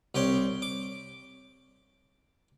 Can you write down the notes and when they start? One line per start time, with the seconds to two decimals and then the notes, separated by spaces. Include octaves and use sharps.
0.15 C2 G4 C#5 G5
0.62 D6